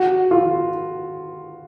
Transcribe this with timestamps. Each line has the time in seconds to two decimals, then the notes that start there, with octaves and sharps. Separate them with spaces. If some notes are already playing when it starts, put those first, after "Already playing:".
Already playing: F#4
0.31 F4